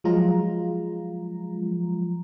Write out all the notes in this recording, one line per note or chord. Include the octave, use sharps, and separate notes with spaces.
F3 F#3 G#3 F4 A#5